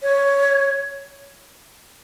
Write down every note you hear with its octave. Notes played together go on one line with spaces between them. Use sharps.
C#5